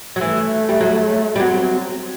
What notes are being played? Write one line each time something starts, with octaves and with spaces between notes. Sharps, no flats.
F#3
E3 A3
G3
F#3
G3
F#3 C4